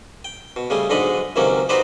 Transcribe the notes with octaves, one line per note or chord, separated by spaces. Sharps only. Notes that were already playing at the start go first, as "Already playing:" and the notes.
G5
B2
C#3 G3 A3 G#4
B1 G#2 D3 D4 D#5 B5
C#2 C3 D#3 F#3 A#3 C#4
D#4 F#4 G4 B4 C5 D5